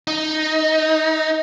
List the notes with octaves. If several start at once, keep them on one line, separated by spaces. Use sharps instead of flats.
D#4